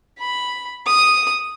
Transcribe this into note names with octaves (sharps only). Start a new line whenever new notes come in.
B5
D#6